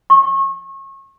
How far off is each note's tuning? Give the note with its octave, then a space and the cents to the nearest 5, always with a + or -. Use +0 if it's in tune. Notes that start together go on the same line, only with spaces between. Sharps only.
C#6 -30